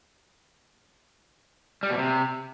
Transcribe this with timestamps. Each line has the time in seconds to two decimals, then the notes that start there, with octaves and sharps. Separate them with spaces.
1.83 G3
1.90 B2
1.98 C3